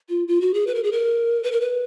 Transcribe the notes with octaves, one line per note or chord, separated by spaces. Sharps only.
F4
F4
F#4
G#4
B4
A#4
G#4
A#4
B4
A#4
B4